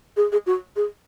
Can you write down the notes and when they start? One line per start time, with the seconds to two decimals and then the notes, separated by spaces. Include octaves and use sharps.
0.17 G#4
0.32 G#4
0.46 F#4
0.76 G#4